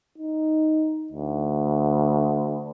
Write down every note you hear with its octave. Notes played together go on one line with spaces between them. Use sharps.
D#4
D2